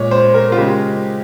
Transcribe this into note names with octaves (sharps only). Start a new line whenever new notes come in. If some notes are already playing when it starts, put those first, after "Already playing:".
Already playing: A#2 G#3 C#5
C5
A#4
F4
C#3 G#3 G4